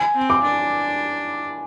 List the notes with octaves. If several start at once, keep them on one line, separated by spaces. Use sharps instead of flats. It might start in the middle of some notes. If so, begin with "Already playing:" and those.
Already playing: G#5
C4
D6
D4